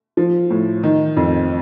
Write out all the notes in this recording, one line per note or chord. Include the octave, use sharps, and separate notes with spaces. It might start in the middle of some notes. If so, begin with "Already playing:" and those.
F3
A2
D#3
F2